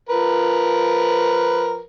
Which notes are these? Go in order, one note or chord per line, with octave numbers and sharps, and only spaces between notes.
F3 A#4 B4